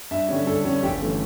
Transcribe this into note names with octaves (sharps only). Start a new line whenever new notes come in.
G2 E5
D3 G3 C#4
G2 A4
D3 G3 C#4
G1 G4
E3 A3 C#4